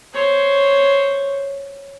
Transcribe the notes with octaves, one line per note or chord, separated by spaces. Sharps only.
C5 C#5